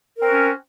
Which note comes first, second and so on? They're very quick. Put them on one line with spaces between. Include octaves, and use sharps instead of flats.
A#4 C4 F#4 C#4